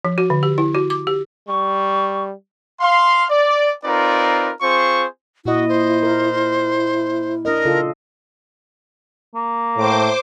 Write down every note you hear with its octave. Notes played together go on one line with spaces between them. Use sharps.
F3
F#4
D3
G4
E4
F#4
D6
G4
G3 C#6
F5 C6
D5
C4 D#4 F4 A#4 B4 D5
C4 F4 G#4 C5 C#6
A#2 E4 F#4 D#5
C5
A#4
E4
D4 A#4 D#5
C#3 F4 A4
A#3
A2 C5 D6